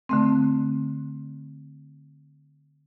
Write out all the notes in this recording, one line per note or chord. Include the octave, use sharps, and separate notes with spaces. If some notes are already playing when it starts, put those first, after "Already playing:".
D3 A3 C4